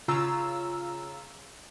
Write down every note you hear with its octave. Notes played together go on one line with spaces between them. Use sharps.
C#3 F4 A#5 E6